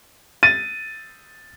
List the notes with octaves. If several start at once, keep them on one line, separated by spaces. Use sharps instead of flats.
A6 D#7